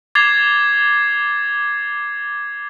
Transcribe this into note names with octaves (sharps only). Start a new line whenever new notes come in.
D6 G#6 A6 C7 F7 G7